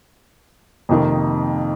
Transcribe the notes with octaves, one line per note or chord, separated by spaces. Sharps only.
F2 C3 D#3 A#3 D#4